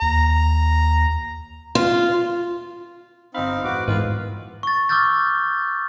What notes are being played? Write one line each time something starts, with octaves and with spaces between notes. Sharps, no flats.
D#2 A#5
F4
G1 C4 D#4 F5 B5
E2 A2 F#4 B4 C5 D6
E2 G#2 D#3 E3 F4 B4 F5
C#6 A6
C#6 D6 E6 F6 G6 A6